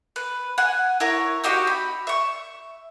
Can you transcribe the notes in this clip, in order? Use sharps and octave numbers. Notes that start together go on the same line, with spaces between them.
B4
F#5 G#5
E4 A#4 C#5
C4 D#4 F#4 G4
B5
E5 C#6